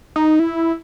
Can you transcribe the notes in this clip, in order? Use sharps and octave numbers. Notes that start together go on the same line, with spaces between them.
D#4
E4